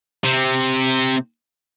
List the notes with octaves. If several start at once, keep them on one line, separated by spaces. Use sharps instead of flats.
C3 C4